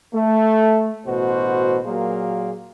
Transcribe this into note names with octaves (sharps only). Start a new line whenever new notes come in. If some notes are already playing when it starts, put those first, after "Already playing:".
A3
A1 B2 F#4 C5
A#2 F#3 A#3 F4 G#4